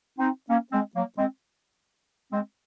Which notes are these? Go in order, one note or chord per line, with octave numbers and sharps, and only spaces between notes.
C4 D#4
A#3 C#4
G#3 C4
F#3 A#3
G#3 C4
G#3 C4